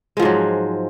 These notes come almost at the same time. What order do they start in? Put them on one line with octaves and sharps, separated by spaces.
G#3 F3 G#2 F#3